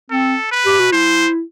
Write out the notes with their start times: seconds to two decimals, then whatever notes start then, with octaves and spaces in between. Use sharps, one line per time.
0.10 C4 A4
0.51 B4
0.66 G4
0.79 F#4
0.92 E4 C5